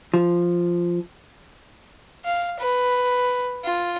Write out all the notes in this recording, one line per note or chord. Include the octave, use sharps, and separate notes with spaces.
F3
F5
B4
F4